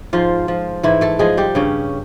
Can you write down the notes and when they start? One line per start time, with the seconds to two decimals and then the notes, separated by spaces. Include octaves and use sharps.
0.13 G#2 F3 F4
0.48 F3
0.83 G#2 E3 E4
1.01 A3 A4
1.19 F3 G#3 G#4
1.37 G3 G4
1.55 G2 C#3 C#4